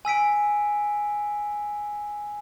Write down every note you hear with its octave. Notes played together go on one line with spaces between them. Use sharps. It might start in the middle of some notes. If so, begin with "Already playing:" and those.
G#5 E6 B6 D7